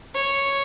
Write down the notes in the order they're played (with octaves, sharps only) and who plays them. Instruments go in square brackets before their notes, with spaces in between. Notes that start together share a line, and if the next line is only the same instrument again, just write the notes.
[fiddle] C#5